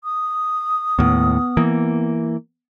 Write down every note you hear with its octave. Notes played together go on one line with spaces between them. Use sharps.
D#6
D#2 A2 B3
E3 A#3